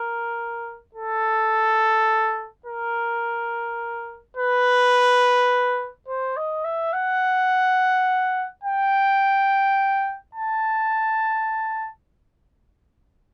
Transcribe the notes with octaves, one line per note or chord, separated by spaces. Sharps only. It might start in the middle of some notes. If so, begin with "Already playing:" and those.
Already playing: A#4
A4
A#4
B4
C5
D#5
E5
F#5
G5
A5